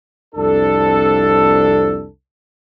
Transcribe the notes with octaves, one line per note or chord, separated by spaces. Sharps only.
C2 F2 D4 A4